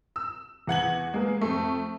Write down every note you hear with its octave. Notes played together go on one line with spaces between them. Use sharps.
E6
E2 F#5 G#6 F#7
G#3 A#3 B3
F2 A3